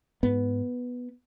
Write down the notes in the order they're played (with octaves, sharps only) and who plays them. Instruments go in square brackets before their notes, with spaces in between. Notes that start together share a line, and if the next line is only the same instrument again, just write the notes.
[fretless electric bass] G#2 B3